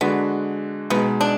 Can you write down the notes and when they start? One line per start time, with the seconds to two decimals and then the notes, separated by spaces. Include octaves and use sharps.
0.01 D3 G#3 B3 D4 F#4
0.90 B2 G#3 B3 D#4
1.21 D4